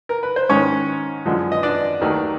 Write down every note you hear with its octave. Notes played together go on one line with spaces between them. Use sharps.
A#4
B4
C5
G#2 D#3 G#3 C#4 C#5
F#2 D3 F3 G#3
D#5
D4 D5
D#2 D#3 F#3 A3